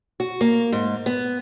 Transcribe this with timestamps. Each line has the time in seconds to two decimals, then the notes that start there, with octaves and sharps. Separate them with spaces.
0.20 F#4
0.41 A#3
0.72 G#2
1.06 B3